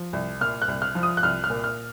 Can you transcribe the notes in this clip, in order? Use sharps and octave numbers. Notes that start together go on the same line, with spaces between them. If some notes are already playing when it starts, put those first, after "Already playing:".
Already playing: F3
C2
A#2 F6
F#6
C2
F6
F3
D#6
F#6
C2 F6
F6
A#2
F6